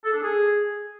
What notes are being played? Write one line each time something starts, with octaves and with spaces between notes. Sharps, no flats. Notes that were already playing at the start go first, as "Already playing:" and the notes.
A4
D4
G#4